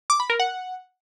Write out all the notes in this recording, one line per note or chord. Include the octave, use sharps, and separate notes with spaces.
D6
B5
A#4
F#5